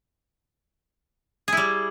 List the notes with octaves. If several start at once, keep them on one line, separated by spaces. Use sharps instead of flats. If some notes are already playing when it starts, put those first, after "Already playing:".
G3 E4 G#4